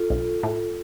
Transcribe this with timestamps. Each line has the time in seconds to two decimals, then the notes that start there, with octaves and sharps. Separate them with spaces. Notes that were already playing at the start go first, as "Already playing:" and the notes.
Already playing: F4 A4
0.10 B1
0.43 A2